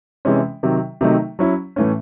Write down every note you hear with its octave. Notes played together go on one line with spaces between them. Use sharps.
C3 E3 G#3 C#4
C3 D#3 F#3
C3 D#3 F#3 A3 D#4
F#3 C#4 E4
A2 E3 A3 C#4